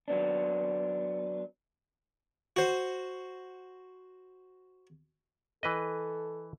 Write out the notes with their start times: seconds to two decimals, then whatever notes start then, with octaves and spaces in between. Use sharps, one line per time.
0.08 F#3 B3 D4
2.56 F#4 C5
5.63 E3 A4 B4 D#5